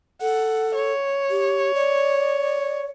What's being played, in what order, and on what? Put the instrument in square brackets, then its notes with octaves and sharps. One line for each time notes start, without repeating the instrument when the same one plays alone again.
[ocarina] A4 [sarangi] F#5
[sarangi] C#5
[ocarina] G4
D5